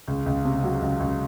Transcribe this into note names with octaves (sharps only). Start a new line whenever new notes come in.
C#2
C#2
C3
F#3
C#2
C#2